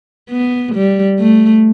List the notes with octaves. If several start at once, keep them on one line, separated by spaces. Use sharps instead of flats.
B3
G3
A3